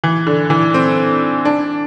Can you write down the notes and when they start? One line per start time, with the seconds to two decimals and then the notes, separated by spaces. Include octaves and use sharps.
0.04 E3
0.27 D3
0.50 E3
0.74 C4
1.45 D4